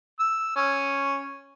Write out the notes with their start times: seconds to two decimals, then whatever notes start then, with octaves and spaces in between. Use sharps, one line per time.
0.19 E6
0.56 C#4